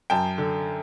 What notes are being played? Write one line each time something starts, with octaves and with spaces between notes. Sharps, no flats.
F#2 G5 A5
D3